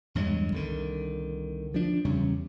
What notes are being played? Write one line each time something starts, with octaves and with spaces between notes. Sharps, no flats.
E2 G2 F#3 G#3
C2 D3 D#3
F3 D4
E2 C#3 G3 C#4